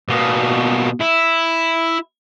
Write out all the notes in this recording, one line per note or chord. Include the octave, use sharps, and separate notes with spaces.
B2 A#3
E4